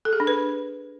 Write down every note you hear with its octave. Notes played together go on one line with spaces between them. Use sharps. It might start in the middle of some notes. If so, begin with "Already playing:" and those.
A4
G#4
D4
B4